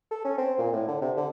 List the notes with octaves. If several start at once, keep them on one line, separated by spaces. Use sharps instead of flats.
A4
C#4
C4
A#2
A2
D3
C3
D3